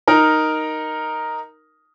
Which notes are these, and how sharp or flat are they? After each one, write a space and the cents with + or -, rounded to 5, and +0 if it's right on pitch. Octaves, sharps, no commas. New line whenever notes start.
D#4 +0 A#4 +0